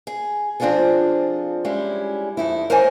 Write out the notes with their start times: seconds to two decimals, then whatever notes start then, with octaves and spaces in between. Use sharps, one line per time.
0.07 G#4
0.60 F3 C4 D4 F4 G#4 A4
1.65 G3 G#3 C#4 E4
2.37 F2 D#4 E4
2.70 A#4 C5 C#5 D#5 G#5